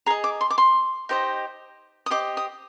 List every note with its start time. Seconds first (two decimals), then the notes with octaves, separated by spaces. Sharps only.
0.06 G#4 D#5 A#5
0.24 D6
0.41 C6
0.50 D6
0.58 C6
1.09 D#4 G4 C5 D#5
2.06 D#6
2.10 G4 C5 D#5 D6
2.37 D#6